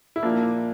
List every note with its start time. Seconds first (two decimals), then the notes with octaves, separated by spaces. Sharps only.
0.16 E4
0.23 A#2 F3 A#3 D4